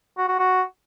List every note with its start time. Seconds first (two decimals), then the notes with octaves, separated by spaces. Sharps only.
0.18 F#4
0.28 F#4
0.39 F#4